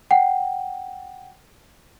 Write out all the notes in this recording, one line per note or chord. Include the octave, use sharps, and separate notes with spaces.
F#5 G5